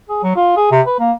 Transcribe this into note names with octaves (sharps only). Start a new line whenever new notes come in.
G#4
F#3
F4
G#4
C3
B4
A#3